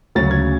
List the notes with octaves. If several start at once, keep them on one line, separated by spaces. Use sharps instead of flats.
D2 C#3 F#3 C#4 A6
G#6